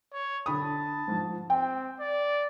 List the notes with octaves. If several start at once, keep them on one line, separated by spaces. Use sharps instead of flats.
C#5
D3 A5 B5 D#6
G#2 F3
C4 G5
D5